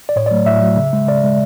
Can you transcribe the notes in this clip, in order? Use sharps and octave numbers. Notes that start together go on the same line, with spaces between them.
D5
A2 C#5
D5
F#3 A3
A2 E5
F#3 A3
C#3
G#3
C#3 D5
G#3